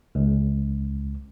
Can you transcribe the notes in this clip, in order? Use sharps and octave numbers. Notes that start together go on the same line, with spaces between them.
C#2